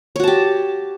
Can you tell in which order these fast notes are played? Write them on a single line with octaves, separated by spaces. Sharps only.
C#5 F#4 A5 G4